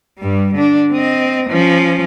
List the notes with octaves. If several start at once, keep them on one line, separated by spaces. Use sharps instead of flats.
G2 G3
D3 D4
C4 D#5
F3 C#4